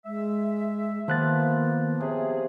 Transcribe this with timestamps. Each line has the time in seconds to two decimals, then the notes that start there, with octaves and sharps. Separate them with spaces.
0.06 G#3 E5
1.08 D#3 F3 A#3 B3 B4 F#6 A6
2.01 C3 C#4 G#4